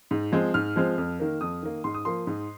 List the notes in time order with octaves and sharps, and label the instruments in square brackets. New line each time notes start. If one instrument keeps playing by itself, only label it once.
[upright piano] G#2
F3 G#3 C4
G#2 F6
F3 G#3 C4
F2
D#3 A#3
F2 D#6
D#3 A#3
G#2 C6
D#6
F3 A#3 C6
G#2